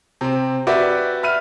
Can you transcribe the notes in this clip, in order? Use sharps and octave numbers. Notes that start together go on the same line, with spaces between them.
C3 C4
F#4 G4 B4 D5 E5
E5 B5 F6 D#7